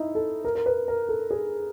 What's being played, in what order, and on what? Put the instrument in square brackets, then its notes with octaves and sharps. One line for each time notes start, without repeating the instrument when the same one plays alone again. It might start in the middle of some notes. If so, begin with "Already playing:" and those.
Already playing: [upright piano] D#4 E4
A4
A#4
A#4
B4
A#4
A4
G#4